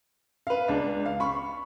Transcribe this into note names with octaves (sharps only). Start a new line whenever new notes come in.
B4 F5
C#2 D4
F5
B5 C#6